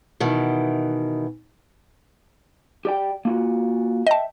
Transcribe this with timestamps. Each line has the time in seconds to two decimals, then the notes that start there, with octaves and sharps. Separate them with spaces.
0.20 B2 D#3 E3
2.85 G4 D5 G5
3.25 A#3 F4 F#4
4.07 D#5 E5 G5 A5